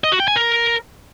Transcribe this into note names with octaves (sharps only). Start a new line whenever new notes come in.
D#5
F#4
G5
G#5
A#4